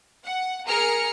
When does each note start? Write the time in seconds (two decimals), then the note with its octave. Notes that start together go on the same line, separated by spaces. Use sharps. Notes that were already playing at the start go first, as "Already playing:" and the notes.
0.25 F#5
0.67 G#4 A#4 A#5 F6 C#7